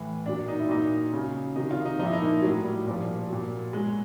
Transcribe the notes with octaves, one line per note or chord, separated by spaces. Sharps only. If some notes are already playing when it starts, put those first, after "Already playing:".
Already playing: A2 E3
A#2 F#3 D4
D#4
E4
A#2 F#3 D#4
C#3 F#3
C3 D#3 F#3 D#4
F4
D#4
A#2 F3 D#4 E4
D#4
A#3
A2 F#3
G3
A#2 F3
A#2 F#3
B2 F#3 G#3